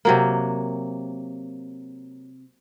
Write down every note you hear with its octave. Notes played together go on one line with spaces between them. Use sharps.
C3 F#3 A#3